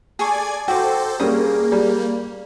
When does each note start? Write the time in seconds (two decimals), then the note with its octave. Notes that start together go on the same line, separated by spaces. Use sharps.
0.19 G#4 A4 D5 G#5 C#6 G#6
0.68 F#4 A4 C5 G5 D6
1.20 G3 A#3 C#4 G#4 D#6
1.72 G3